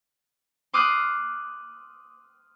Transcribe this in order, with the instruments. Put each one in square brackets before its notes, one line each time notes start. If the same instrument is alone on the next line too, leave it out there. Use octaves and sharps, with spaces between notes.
[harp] C6 D6 D#6 F6 F#6 C7